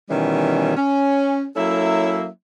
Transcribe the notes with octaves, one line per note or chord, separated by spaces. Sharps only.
B2 D#3 E3 G3 C#4
C#4
F#3 A#3 C#4 E4 A4 E5